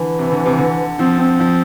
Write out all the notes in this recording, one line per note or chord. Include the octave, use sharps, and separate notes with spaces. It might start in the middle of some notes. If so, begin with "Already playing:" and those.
Already playing: D3 E3
C3
D3
C3
D3
F3 C4
C4
F3